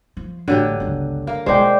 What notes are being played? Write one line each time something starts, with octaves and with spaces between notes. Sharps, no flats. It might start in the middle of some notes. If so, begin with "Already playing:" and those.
F3
A1 D3 F#3 G4 D#7
G1 C#2
A#3
B1 G#3 F4 C5 D5 G5